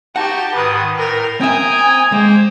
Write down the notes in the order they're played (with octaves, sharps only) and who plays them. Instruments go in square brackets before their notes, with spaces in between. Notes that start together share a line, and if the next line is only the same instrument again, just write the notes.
[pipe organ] D#4 F#4 [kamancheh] G4 A5 [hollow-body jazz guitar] F#5
[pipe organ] G#2 D#3 [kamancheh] B4 D#6
[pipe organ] A2 [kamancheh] A#4 G5
[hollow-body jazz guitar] C4 E5 [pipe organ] G5 A#5 D#6 [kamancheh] G#5
[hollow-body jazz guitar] G#3 [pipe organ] A#3 C5